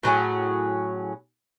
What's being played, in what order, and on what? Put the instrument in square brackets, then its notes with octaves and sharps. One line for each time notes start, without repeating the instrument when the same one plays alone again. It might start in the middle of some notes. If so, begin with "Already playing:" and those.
[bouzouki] A2 F#3 C#4 G#4